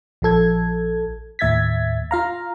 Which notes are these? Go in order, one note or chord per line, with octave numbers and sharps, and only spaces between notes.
A#1 F3 A4 G#6
D#2 A2 E5 G#6 A6 B6
F4 F5 A#5